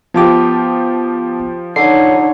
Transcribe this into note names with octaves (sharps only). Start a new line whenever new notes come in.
F3 B3 F4 G4 A5 D6
D3 D#4 C#5 C7